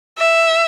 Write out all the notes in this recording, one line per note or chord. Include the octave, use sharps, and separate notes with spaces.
E5